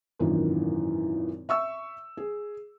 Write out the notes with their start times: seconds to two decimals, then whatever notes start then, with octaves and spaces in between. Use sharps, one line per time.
0.19 G#1 F#2 A#2 D#3 E3
1.49 E5 C#6 E6
2.17 G#4